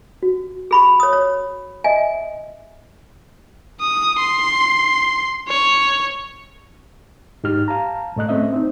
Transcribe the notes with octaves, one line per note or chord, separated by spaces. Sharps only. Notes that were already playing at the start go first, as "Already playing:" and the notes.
F#4
G#4 B5 C#6
C#5 D#6
C#5
D#5 E5 G#5
D#6
C6
C#5
G#2 D#4 G4 F6
F5 A5 A#5
A2 A3 D#5 F#6
A3 C4 C#4 D#5 E5
C4 D#4